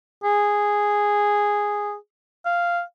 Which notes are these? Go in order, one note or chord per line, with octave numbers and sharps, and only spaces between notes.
G#4
F5